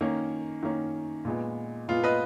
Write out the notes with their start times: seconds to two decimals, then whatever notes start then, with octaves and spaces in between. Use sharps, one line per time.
0.01 D#3 A#3 C#4
0.63 D#3 A#3 C#4
1.25 A#2 G#3 B3
1.88 A#2 G#3 B3 F4
2.04 B4 D#5